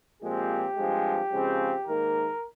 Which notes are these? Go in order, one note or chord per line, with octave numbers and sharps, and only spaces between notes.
A#2 F3 G#3 C4 G4
G2 F3 G#3 C4
C#3 F3 G#3 C4
G#2 D#3 A#3 A#4